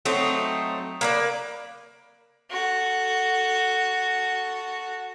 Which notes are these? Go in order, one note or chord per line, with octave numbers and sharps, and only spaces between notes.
F#3 A3 C4 D#4
A#3 B4 D5
F#4 A4